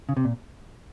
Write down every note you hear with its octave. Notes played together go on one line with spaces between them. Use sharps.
C#3
C3
A#2